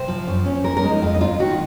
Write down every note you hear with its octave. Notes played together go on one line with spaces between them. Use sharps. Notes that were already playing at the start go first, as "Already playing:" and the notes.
Already playing: C3 C5
F3
F#2
C#4
F3 A#4
A#4
G#3
D#4
F2 F4
D#4
C#4 F4
D#3 F#4